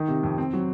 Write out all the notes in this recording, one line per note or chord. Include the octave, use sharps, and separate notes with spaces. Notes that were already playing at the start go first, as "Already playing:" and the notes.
Already playing: D#3 D#4
C3
F2
C4
F#3